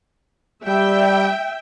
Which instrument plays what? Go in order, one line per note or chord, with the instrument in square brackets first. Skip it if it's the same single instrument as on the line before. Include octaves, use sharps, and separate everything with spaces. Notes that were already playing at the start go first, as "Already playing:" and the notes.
[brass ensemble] G3 [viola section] E5 G5